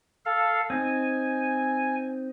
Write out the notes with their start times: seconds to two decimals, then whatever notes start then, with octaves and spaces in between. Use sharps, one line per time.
0.26 A4 F5
0.70 C4 D#4 G#5